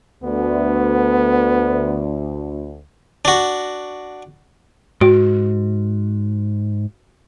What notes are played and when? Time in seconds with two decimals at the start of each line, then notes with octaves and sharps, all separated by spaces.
0.23 D2 B3
3.25 D4 F#4
5.01 G#2 F#4